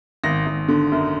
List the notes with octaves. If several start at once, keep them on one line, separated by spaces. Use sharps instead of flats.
G#1 A#6
G#1
D3
F#2